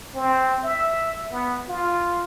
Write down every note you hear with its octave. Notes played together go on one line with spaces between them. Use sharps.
C4
E5
B3
F4